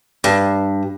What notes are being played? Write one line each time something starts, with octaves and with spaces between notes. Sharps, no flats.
G2